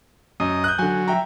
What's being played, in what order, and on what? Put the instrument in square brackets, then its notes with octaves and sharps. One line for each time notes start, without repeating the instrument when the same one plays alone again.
[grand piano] F#2 [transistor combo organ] D#5
[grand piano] F#6 G6
[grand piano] D3 G#5 [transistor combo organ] F#3
[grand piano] E5 G5 A#5